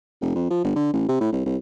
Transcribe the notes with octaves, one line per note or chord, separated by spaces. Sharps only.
F1
F2
F3
G1
D3
A1
C3
A2
C2
C2